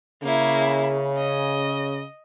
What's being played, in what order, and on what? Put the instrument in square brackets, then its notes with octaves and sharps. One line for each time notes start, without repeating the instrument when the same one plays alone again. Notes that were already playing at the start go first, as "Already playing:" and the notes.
[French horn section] C#3 [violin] A#3 E4
[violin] D#5